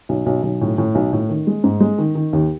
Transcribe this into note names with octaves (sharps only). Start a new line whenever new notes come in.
B1
B1
B1
A2
A2
B1
A2
D#3
G#3
G#2
G#3
D#3
D#3
D#2